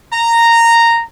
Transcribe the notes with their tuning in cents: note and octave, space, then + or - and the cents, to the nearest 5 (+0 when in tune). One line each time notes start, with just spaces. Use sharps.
A#5 -10